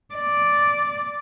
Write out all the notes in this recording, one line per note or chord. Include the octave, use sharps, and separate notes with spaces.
D5